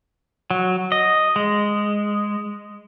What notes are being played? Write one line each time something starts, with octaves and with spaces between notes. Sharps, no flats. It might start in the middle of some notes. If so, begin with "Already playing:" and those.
F#3
D#5
G#3